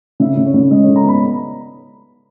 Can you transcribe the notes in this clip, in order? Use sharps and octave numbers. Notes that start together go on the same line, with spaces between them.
C#3 E5
C#3
C#5
C#3
G#3 D#5
C#5
C#3
A#5
B3 B5